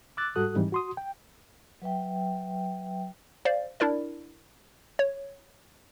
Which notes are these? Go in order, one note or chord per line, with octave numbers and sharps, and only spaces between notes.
D6 E6 F#6 A6
G#2 G3 F#4 A4 D#6 F#6
G#2 E3 G3 C4 D#4
F#4 C6 D#6
G5
F#3 B4 E5 G5
C5 D5 F5
D4 E4 A#4 D5
C#5